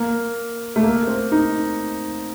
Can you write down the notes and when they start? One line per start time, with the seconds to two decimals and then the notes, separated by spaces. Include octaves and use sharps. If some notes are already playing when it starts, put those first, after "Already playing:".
Already playing: A#3
0.76 A3
0.83 A#3
1.07 C4
1.32 D#4